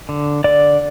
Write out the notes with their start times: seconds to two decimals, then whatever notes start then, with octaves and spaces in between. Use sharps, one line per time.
0.09 D3
0.44 D3 D5